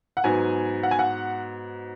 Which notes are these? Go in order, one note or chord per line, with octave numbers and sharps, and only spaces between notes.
F#5
G#2 F#3 B3 G#5
F#5
G#5
F#5